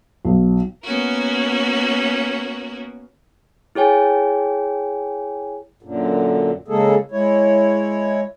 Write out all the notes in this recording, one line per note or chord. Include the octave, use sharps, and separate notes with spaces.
B1
A#3 B3 C#4 F#4 A#4
E4 G#4 C#5 G5 G#5
F#2 A#2 D3
C#3 G#3 A#3 G#4 A4
G#3 E4 C#5